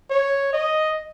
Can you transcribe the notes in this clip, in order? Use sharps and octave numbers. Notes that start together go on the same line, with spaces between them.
C#5
D#5